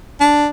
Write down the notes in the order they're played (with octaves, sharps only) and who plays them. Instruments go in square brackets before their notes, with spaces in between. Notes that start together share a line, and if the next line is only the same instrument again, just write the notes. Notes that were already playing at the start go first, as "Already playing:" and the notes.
[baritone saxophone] D4